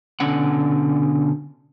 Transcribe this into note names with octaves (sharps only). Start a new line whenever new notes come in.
B2 D3 C#4 F#5